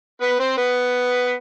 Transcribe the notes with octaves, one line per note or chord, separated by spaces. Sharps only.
B3 B4
C4 C5
B3 B4